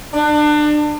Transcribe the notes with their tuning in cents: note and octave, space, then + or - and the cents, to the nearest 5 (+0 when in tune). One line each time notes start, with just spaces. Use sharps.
D4 +30